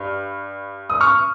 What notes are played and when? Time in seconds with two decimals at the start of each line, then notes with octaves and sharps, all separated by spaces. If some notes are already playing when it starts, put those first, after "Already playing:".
Already playing: G2
0.90 D#6
1.01 C#6 F6